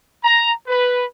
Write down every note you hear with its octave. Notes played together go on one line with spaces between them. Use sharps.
A#5
B4